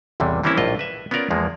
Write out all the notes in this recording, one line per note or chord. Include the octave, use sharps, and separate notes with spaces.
A1 E2 C3 E3 G3
E3 G3 A#3 C4 C#4 E4
A#1 A2 F4 D#5
B4 E5
B3 C#4 F4 A#4 D5
E2 F3 G#3 A#3